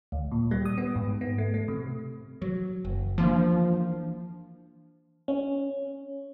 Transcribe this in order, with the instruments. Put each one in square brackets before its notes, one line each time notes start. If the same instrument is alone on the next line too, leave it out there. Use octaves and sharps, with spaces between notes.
[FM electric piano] D2
A#2
G3
D#6
B3
G#2
B3
A3
A3
C3
[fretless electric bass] F#3
F#1
[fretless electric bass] E3 A#3 D4 [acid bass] F3
[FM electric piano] C#4